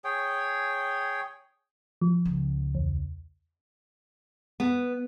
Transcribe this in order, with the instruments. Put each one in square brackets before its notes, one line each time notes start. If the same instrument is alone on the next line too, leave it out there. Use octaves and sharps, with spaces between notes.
[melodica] G#4 C#5 G5
[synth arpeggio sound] F3
[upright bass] C#2
[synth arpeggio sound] E2
[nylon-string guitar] B3